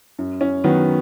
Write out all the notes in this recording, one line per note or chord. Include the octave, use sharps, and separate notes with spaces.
F#2
C#4
D#3 F#3 B3